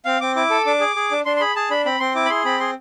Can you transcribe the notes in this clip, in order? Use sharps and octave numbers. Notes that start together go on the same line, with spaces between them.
C4 F5
C4 D6
E4 D6
A4
D4 D6
G#4
G#4
D4
D4 C6
C6
G#4 B5
G#4 A5
D4 B5
C4 B5
C4 C6
E4 D6
B5
G#4 C6
C4 B5
G#4 C6